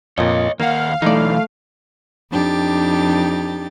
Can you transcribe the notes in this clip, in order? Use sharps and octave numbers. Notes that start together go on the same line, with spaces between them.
F2 A#2 C#5 D#5
D#2 A#3 F5 F#5
B1 E3 A3 D#4 D5
F2 D4 D#4 G4 A6